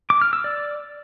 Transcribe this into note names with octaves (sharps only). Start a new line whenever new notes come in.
D6
F6
E6
D5